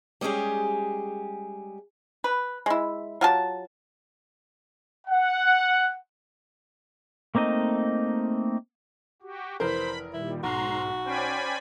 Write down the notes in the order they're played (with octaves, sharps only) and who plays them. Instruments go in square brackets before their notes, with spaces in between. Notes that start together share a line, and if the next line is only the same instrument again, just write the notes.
[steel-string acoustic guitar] G3 G#3 C#4 G4 G#4
[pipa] B4
G#3 E4
F#3 F4 G4 A5
[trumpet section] F#5
[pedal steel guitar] A3 A#3 C4 D#4 D#5
[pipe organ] F#4 G4
[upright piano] F1 E3 A#4 [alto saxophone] C5 [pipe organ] B5
[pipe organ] A#2 D#3 G3 [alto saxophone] E4
[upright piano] B1 [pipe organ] G#2 [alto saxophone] F#4 [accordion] A#5 C6
[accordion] C#4 C5 G5 [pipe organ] D5 G#5 B5